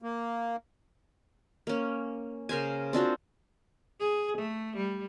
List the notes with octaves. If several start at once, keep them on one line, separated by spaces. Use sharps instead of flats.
A#3
A#3 C#4
C#3 A#4 C5 G#5
C4 D4 F4 F#4
G#4
A3
G3